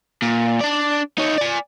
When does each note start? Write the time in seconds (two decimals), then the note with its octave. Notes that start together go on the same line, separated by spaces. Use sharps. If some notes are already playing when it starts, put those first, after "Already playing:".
0.22 A#2
0.61 D4 D5
1.18 D#4 C#5
1.38 D5 G#5